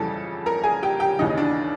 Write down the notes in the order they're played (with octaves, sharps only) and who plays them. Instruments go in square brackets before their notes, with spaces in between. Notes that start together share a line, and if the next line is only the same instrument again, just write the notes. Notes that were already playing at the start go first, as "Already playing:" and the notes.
Already playing: [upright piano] F2 C#3 E3 G3 A4 A5
A#4 A#5
G#4 G#5
G4 G5
G4 G5
D#2 C#3 E3 D#4 D#5
D#5
D4 D5